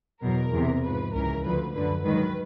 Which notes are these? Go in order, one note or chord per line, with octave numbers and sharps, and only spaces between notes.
E2 B2 F#3 A#4
E2 C3 E3
G#2 F3 B4
C#2 C#3 E3 A#4
D2 D3 F3 B4
F#2 D3 F#3 B4
G#2 D#3 F#3 B4